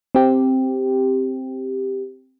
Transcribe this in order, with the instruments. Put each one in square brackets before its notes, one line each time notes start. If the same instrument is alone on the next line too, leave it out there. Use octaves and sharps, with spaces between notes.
[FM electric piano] C4 G4